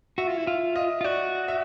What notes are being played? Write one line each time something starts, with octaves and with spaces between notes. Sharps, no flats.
F#4 E5
F4
E4
F4 E5
D#5
F4
F#4 D5
E5